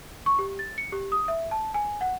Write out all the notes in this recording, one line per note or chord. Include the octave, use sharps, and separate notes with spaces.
C#6
G4
A6
C#7
G4
D#6
E5
A5
G#5
F#5